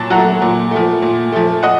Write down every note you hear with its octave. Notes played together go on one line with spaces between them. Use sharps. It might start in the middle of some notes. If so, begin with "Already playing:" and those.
Already playing: A#2 F#3 A5
F#3 A3 F#5 A#5
A#2
F3 A3
A#2
F3 A3
D#5 F#5